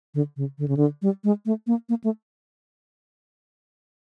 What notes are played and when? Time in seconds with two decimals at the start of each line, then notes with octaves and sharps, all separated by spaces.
0.14 D3
0.37 C#3
0.58 D3
0.68 C#3
0.77 D3
1.02 G3
1.24 G#3
1.46 A3
1.67 A#3
1.89 A#3
2.04 A3